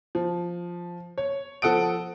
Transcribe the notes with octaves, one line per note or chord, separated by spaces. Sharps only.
F3
C#5
F3 A4 F#5 D#6 D7